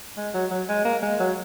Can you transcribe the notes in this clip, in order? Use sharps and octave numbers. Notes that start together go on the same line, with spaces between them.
G#3
F#3
F#3
G#3
A#3
G#3
F#3